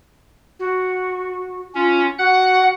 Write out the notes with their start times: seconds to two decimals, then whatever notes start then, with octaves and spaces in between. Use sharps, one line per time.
0.60 F#4
1.75 C#4 F4
2.19 F#4 F#5 F#6